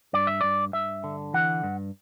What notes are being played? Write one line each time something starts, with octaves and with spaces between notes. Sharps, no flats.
G2 D5
E5
G2 D5
G2 E5
D3
E3 F#5
G2